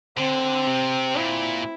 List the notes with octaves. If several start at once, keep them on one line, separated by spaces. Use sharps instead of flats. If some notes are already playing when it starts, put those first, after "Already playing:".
D3 C4
C3
A#2 E4